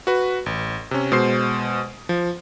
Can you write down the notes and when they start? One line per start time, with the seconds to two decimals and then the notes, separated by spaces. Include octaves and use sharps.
0.07 F#4 B4
0.46 A1
0.91 C3 C#4
1.12 B2 G#3 C5 C7
2.09 F3